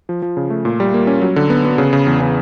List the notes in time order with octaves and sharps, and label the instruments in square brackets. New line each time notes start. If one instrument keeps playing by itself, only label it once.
[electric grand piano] F3
F3
C#3
A3
A#2
G3
A#3
C#4
F#3
D3
B3
B3
C#3
C#3
E2
C#3